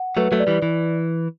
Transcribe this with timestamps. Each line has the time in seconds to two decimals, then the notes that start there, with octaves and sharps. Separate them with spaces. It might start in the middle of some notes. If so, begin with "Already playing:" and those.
Already playing: F#5
0.17 F#3 A3 B4
0.32 F#3 A3
0.40 D5
0.47 E3 G3
0.62 E3